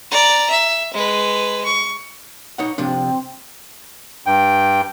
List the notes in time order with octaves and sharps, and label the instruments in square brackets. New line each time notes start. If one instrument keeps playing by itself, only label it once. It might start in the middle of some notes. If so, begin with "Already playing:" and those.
[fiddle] D5 A#5
E5
G#3 B4
C#6
[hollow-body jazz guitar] D#4 C#5 F#5
[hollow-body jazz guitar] C3 F3 D4 [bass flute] C4
[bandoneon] G2 G5